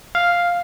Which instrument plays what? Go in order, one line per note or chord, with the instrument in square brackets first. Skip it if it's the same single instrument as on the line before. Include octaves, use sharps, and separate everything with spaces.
[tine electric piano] F5